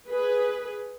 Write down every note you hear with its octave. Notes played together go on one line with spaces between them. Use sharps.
G#4 B4